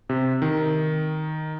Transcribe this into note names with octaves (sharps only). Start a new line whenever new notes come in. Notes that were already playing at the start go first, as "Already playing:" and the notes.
C3
D#3